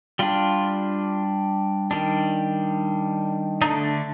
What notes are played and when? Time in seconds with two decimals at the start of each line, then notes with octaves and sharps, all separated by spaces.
0.19 G3 D4 F4
1.91 D#3 G3 D4
3.62 D3 A3 D4 D#4